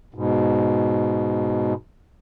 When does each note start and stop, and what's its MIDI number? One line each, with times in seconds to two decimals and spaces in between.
0.14 1.74 44
0.14 1.74 47